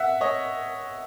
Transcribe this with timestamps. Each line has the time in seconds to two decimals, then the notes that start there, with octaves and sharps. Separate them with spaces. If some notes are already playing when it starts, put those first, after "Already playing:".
Already playing: E5 F#5
0.21 C#5 D#5